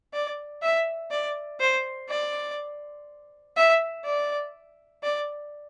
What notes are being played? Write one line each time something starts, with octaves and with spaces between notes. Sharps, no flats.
D5
E5
D5
C5
D5
E5
D5
D5